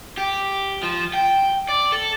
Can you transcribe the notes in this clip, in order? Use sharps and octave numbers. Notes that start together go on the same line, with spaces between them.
G4
F3
G5
D5
A4